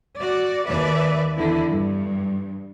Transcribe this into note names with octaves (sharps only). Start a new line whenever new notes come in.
F#4 D5
D#2 B4 D5 E5
E2 D3 E4
G2